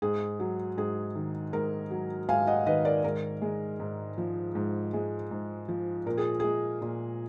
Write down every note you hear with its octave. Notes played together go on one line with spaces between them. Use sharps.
G#2 G#4
F#3
G#2 G#4
D#3
G#2 A#4
F#3
G#2 F5 G#5
D#5 F#5
D#3 B4 D#5
A#4 D5
G#2 A#4
G#3
G#2
F3
G#2
G#3
G#2
F3
A#2 A#4
G#4
G#3 G#4
A#2